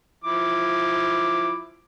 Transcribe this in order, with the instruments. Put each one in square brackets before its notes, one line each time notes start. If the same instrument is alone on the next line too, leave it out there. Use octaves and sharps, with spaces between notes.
[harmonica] F3 E4 D6